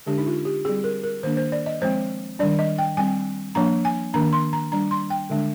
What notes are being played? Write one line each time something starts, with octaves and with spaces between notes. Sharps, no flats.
D3 G#3 D4 G4
D#4
F4
G4
G3 C4 G#4
A#4
A#4
D#3 A#3 D4 C5
C5
D5
D#5
F3 G#3 C4 C5
D#3 G3 D4 D5
D#5
G5
G3 C4 G#5
F3 A#3 D4 A#5
G#5
D#3 A#3 D4 A#5
C6
A#5
G3 D4 A#5
C6
G5
D3 G#3 D4